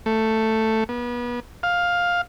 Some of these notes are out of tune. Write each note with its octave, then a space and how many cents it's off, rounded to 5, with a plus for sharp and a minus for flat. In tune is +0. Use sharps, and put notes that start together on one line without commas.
A3 +5
B3 -30
F5 +10